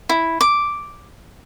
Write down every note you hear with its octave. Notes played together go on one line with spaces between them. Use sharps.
E4
D6